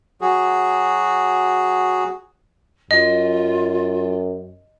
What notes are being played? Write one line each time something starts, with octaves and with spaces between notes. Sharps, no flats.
F#3 F#4 G#4
F#2 F4 D#5